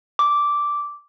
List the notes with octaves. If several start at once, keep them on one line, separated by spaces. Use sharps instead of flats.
D6